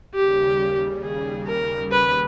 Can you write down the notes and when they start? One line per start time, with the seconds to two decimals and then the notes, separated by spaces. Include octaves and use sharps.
0.14 D#2 C#3 G3 G4
1.03 G#4
1.47 A#4
1.92 B4